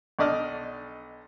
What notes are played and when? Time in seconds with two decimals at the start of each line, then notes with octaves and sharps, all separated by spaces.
0.19 B1 D4 D5 D#5 F6